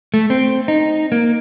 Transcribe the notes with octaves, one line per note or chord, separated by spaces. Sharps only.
A3
C4
D#4
A#3